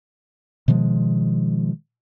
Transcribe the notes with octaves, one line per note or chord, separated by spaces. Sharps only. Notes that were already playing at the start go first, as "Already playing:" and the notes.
B2 D#3 F3 G#3